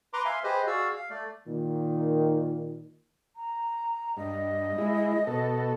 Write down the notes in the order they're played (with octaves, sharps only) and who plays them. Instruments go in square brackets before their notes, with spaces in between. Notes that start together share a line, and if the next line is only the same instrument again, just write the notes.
[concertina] B4 A#5 C6 D6
E5 F5 G#5 C6
G4 G#4 B4 C5 D#5
F#4 G#4 D5 F5 E6
F5
A3 D5
[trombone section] A#2 D#3
[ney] A#5
[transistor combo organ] G2 [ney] D#5
[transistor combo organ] G#3 E4
B2 A4